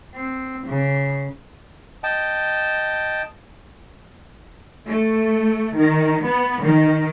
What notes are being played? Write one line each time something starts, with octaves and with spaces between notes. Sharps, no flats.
C4
C#3
D#5 G5 A5
A3
D#3
B3
D#3